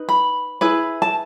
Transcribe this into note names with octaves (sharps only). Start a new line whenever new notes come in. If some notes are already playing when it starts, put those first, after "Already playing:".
Already playing: D#4 B4
B5
E4 G#4 B4
A5